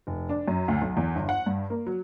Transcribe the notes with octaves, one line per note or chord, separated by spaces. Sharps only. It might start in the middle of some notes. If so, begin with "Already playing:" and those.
F1
D4
F#2
D2
B1
E2
G1
F#5
G2
A#3
F#3